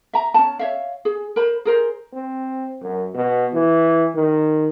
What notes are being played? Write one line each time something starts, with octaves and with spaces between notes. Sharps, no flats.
E5 A#5
C#4 D#4 A5
C#5 E5 F5
G#4
A#4 C5 B5
G#4 A#4 C5
C4
F#2
B2
E3
D#3